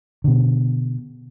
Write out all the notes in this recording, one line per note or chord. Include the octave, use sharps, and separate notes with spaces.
B2 D3